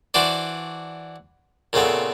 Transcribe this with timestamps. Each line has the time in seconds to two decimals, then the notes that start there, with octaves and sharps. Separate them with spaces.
0.14 E3 D4 F#4 C5 D5
1.73 A#2 C#3 A3 B3 C4